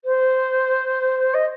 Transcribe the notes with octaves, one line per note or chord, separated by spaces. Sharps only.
C5
D#5